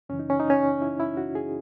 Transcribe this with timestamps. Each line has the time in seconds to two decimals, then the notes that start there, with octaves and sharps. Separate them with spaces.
0.09 F#2 C#3 E3 C#4
0.19 D#4
0.30 C#4
0.40 D#4
0.50 C#4
0.82 E4
1.00 E4
1.17 F#4
1.35 G#4